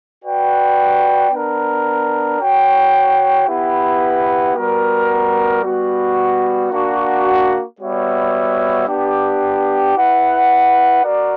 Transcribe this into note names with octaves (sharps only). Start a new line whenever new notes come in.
F#4 B4 D5 G5
B3 D4 A#4
F#4 C#5 G5
B3 E4 G4 B4 F#5
G3 B3 F#4 A#4
G3 B3 F#4
A#3 D4 F#4
G3 B3 F#4 C#5 E5
B3 D4 G4
E4 B4 F#5
F#4 A#4 D5